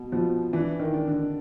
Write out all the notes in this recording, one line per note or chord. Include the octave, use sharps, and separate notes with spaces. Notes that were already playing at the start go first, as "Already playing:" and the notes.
Already playing: B2
B2 F3
E3 D4
D#3
D4
D3